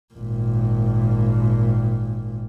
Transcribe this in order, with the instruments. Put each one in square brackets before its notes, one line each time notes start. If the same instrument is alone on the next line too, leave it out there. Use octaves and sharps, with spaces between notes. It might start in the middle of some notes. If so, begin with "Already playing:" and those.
[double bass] G#1 A#2